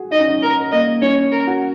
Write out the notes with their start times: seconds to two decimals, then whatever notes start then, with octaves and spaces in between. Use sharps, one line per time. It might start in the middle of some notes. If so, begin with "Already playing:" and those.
Already playing: F#4 G#4
0.11 D#4 D#5
0.20 C#4
0.28 D#4
0.42 A#4
0.71 A#3 D#5
1.02 C#4 C#5
1.32 A#4
1.47 F#4